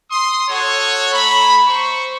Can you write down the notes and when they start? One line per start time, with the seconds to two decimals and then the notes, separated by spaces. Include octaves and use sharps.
0.10 C6 D#6
0.49 F#4 A4 C#5
1.13 A3 A#5 B5
1.67 C5 C#6